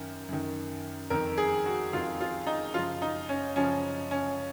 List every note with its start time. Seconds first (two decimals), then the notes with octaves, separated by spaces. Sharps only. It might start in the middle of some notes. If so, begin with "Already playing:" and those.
Already playing: F#2 D#3
0.29 F#2 D#3
1.10 F2 D#3 A#4
1.38 G#4
1.66 F#4
1.93 F2 D#3 F4
2.21 F4
2.47 D#4
2.74 F#2 C#3 F3 F4
3.02 D#4
3.29 C#4
3.56 F#2 C#3 F3 C#4
4.11 C#4